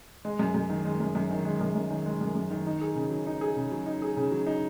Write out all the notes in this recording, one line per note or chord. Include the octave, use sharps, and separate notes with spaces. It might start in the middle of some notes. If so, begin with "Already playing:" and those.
G#3
F#2
F#2
D#3
G#3
F#2
F#2
D#3
G#3
F#2
F#2
D#3
G#3
F#2
F#2
D#3
D#4
G#4
C#3
F#3
D#4
G#4
C#3
F#3
D#4
G#4
C#3
F#3
D#4